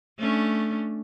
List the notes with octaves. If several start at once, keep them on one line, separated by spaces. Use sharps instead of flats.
A3 C#4 D4